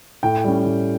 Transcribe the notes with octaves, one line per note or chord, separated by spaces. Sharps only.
A2 G5
G3 C#4
A2